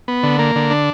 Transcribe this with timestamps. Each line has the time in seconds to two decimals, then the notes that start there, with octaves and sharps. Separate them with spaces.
0.08 B3
0.23 D3
0.39 A#3
0.56 D3
0.71 D4